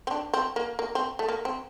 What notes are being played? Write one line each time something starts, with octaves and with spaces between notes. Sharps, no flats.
C4
D4
C4
A#3
A#3
C4
A3
A#3
C4